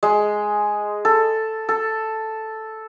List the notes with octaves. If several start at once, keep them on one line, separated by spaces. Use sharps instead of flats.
G#3
A4
A4